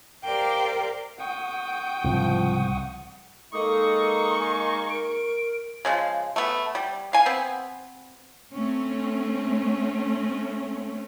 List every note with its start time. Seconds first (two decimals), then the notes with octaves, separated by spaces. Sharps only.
0.24 G4 A#4 C5 D5 F5 G5
1.20 F#5 G5 C#6 D#6
2.04 C2 G#2 C#3 F3
3.53 G#3 A#3 D#4 A4 C#6 D#6
4.38 G#5
4.90 A#4 D7
5.85 C#3 F3 G#3
6.36 A3 B3
6.75 G3
7.13 F5 G#5
7.26 B3 C4
8.53 A3 C4 C#4